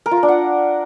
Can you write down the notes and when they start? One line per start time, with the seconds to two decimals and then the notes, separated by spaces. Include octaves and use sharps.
0.06 A#4
0.11 F4
0.17 A#4
0.23 D4
0.28 F#5